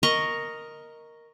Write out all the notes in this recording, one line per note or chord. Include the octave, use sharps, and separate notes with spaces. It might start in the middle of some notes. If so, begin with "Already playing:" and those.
A#4 D#5 C#6